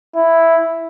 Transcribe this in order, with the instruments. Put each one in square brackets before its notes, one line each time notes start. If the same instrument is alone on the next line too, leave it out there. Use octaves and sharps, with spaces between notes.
[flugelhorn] E4